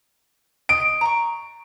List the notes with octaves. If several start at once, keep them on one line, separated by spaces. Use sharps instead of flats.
D#5 D7
A#5 C#6